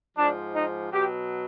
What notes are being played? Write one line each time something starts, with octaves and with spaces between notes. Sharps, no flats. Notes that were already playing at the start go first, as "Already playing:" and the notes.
G#2 F3 D4
D#4
B2 F#3 G4